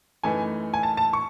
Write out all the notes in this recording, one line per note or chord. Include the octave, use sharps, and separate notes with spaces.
F#2 E3 A3 D#4 G#5
G#5
A5
A5
C#6